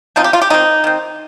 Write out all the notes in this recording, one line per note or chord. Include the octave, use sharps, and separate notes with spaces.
F3 C4 D#4
G4
F4
G4
D#3 C4 D#4
D#3 C4